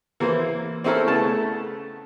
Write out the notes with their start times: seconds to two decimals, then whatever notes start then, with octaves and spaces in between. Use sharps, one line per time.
0.20 E3 A#3 E4 C5
0.84 C4 C#4 E4 A4 A#4
1.06 C#3 A3 B3 A5